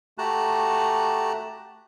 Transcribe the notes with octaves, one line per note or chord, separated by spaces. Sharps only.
A3 F#4 G4 A5 A#5 F#6